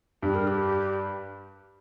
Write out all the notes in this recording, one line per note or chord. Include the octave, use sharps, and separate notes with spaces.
G2 G4
A#4
G4